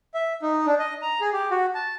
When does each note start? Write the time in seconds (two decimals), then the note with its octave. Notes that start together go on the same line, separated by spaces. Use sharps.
0.14 E5
0.42 D#4
0.66 D4
0.79 D#5
1.02 A#5
1.20 G#4
1.33 G4
1.51 F#4
1.75 A5